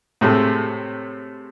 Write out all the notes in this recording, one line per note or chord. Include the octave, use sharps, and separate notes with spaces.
A2 C3 G#3 A3